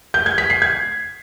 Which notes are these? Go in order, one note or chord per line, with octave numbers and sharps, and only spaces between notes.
G6
G#6
B6
C7
G#6